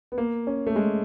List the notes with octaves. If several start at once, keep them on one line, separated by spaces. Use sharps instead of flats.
B3
A#3
C#4
A3
G#3